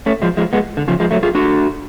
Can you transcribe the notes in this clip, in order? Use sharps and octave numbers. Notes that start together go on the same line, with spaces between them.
A3 C#4
F3 G#3
F3 G#3
G#3 B3
D3
C#3 F3
F3 G#3
F#3 A3
F4 G#4
D4 F#4